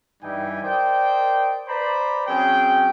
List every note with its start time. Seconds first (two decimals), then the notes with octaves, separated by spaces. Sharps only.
0.23 G2 E3 G3 D#4 G5 G#5
0.63 A#4 C5 D5 D#5 G5
1.68 B4 C5 D5 A#5 B5
2.27 F#3 C4 C#4 G#4 G5